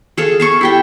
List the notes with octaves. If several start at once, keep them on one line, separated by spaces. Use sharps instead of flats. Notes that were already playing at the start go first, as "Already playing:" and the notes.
G#4 A4 F5
F5 A5 C#6
E4 G4 G5